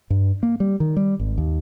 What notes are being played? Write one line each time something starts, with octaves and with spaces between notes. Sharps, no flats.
G2
A#3
G3
D#3
G3
G#1
D#2